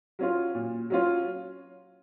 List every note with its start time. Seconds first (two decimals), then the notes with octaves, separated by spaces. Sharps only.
0.19 F#3 C#4 F4
0.55 A#2
0.90 F#3 C#4 F4